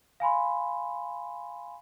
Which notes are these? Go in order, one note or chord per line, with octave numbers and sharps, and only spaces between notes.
F5 G#5 B5 C6